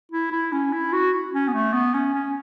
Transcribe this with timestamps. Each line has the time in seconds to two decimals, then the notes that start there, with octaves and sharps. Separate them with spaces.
0.12 E4
0.32 E4
0.52 C#4
0.72 E4
0.93 F#4
1.34 C#4
1.48 B3
1.54 A3
1.73 B3
1.94 C#4
2.14 C#4